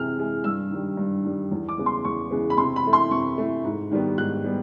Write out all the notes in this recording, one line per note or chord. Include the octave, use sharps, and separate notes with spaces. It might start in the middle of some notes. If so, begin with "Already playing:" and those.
Already playing: C3 E3 G#3 F6
E3 G#3
G2 E6
D#3 G3
G2
D#3 G3
E2
D6
C#3 E3 G#3 B3
C6
E2 C#6
C#3 E3 G#3 B3
B5
C3 C6
B5
E3 A3
C6
C3 C#6
E3 A3
G#2
D#3 G3 B3
G#2 F#6
G3 B3